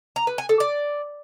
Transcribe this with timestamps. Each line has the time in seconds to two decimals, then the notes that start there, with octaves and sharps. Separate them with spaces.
0.16 A#5
0.27 B4
0.38 G#5
0.49 A4
0.60 D5